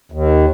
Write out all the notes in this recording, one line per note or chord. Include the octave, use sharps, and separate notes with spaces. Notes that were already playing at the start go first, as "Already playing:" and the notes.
D#2